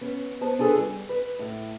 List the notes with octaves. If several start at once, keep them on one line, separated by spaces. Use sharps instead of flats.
B3 C#4
B3 C5 A5
D4 F4 G#4 A4 B4
G3
B4
A2